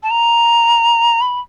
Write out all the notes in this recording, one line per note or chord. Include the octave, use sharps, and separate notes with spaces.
A5
A#5
B5